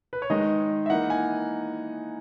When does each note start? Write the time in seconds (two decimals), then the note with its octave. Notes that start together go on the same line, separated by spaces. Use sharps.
0.13 B4
0.22 C#5
0.30 D#3 G#3 D#4 D#5
0.86 E5
0.90 E3 A#3 D#4 F#5
1.10 G#5